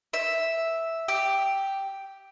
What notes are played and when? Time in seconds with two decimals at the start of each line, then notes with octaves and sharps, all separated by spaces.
0.13 E5
1.08 G4